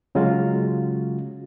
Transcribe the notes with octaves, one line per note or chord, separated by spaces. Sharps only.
C#3 F#3 G#3 C#4 F4 F#4